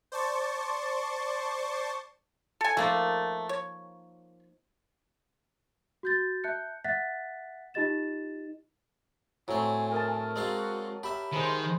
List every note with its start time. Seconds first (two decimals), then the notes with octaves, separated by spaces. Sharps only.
0.12 C5 D5 A5 C#6
2.61 A4 G#5
2.77 F3 A3 A#3 D#4
3.49 C#5
6.03 F#4 G6 A6
6.44 E5 A5 F#6 G6 C#7
6.84 E5 F#5 F#6 A6 B6
7.74 D#4 F4 G4 D#5 A6 E7
9.48 A2 F#3 C4 G#5
9.91 A#4 D#5 A5
10.36 G#3 C4 F#4 F5
11.03 G4 E5 B5
11.33 D#3 G#3 C5 B5